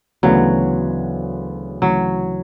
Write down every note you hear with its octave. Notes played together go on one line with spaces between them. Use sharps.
D2 C#3 E3 F#3 B3 D4
D2 C#3 E3 F#3